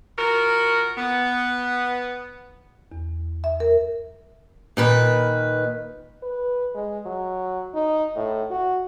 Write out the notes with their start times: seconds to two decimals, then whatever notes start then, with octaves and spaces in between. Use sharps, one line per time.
0.18 F3 F#4 A#4
0.97 B3
2.92 E2
3.44 E5
3.60 A#4
4.77 A#2 D#3 B4
6.23 B4
6.75 G#3
7.06 F#3
7.74 D#4
8.16 A2
8.50 F#4